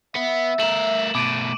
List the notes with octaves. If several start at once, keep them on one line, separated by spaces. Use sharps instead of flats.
B3 E5
A3 A#4 E7 F#7
B2 A3 D6 D7 D#7